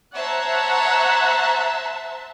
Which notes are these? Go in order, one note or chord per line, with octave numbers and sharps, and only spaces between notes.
C5 C#5 E5 F#5 A5 A#5